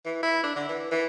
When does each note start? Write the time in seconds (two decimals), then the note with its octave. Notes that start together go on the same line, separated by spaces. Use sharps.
0.05 E3
0.23 E4
0.44 D4
0.56 D3
0.69 E3
0.91 E3